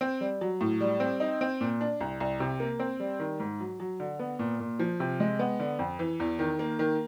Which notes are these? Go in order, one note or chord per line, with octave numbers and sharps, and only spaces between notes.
C4
G3
F#3
A2
G3
C4
D#4
C4
A#2
D4
C2
C2
C3
A#3
C4
G3
D#3
G#2
F#3
F#3
D3
B3
A#2
A#2
F3
C3
G#3
B3
D3
F2
E3
E2
D#3
A#3
D#3